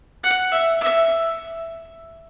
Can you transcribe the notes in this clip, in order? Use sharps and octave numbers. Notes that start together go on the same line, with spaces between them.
F#5
E5
E5